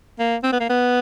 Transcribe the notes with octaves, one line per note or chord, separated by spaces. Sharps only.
A#3
C4
B3
A#3
B3